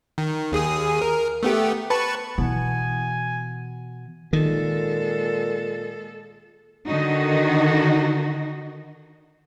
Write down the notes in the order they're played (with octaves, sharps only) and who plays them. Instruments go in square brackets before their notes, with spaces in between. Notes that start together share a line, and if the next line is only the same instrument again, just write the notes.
[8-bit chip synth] D#3
D#2 G#4 D#6
A#4
A3 B3 G4
B4 A5 C#6
[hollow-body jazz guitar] B2 [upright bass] E3 [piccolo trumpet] G#5
[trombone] A#2 [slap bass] D#3 [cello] G#3 A4
[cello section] D3 D#3 D#4 F#4